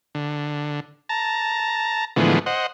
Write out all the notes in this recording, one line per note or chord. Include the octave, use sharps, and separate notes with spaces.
D3
A5 A#5
A2 D3 E3 F3 G#3 B3
C5 D#5 F#5